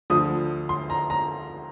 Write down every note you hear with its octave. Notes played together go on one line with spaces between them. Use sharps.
D2 D3 F3 D#6
C6
A#5
A#5